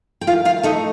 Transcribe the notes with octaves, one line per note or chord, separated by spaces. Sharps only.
G5
D#3 F4 F5
F4 F5
A3 D#4 D#5